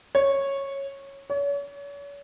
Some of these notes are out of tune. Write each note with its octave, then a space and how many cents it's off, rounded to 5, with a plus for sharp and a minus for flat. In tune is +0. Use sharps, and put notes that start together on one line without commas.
C#5 -10
C#5 +40